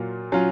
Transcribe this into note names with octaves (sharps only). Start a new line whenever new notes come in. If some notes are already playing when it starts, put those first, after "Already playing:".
Already playing: A#2 F#3 A#3 F4
F#3 C#4 F4